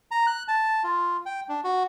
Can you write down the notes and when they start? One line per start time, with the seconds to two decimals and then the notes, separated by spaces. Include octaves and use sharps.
0.11 A#5
0.27 F#6
0.48 A5
0.84 F4
1.26 G5
1.49 D4
1.64 F#4